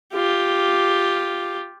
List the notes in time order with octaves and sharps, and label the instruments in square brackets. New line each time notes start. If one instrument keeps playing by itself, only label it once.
[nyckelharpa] F4 G4